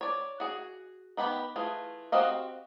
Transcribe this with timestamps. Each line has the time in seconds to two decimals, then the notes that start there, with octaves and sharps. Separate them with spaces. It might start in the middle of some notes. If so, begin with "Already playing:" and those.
0.01 C#5 D5
0.40 F#4 G#4
1.17 D#3 B3 G4 B5
1.56 E3 A3 F4 G#4
2.12 C4 F#4 G4 D#5 F5